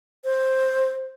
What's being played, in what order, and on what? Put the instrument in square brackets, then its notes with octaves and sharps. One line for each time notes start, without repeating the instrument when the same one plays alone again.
[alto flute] C5